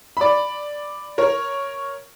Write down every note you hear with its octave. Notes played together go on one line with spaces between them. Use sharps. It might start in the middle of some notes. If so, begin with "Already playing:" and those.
D5 B5
A#4 C#5